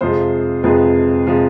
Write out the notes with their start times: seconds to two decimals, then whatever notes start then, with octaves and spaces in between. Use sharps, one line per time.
0.01 F2 C3 F3 G#3 C5
0.63 F2 C3 F3 G#3 B4
1.26 C3 F3 G#3